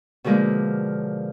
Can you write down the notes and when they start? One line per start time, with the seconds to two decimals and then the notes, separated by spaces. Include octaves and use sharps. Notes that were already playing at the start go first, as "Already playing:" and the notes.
0.24 B2 D3 F3 G#3 A#3